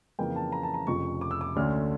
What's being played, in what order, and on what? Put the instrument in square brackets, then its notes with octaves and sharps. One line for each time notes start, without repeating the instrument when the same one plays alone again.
[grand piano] F2 C#3 E3 A#3 C#4 G5
A5
A#5
A5
A#5
F1 F2 C#3 F3 C#6
D6
E6
D6
D2 D3 A3 C#4 F6